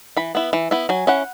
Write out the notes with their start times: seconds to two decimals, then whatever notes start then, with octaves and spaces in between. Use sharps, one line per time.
0.17 E3 B5
0.35 B3 E4
0.53 E3
0.71 B3 E4
0.89 F#3 G#5
1.07 C#4 E4 F#5